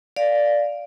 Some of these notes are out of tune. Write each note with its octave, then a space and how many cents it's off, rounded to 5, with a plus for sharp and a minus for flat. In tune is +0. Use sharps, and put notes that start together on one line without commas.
D5 +0 F5 +0